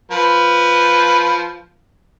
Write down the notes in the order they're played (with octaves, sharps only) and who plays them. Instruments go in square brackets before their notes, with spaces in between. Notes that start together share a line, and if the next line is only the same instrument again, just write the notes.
[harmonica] F3 B4